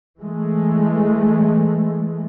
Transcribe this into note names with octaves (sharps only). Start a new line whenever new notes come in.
E3 G#3 A3